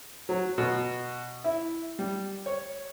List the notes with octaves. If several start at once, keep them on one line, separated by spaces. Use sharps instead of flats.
F#3
B2
E4
G3
C#5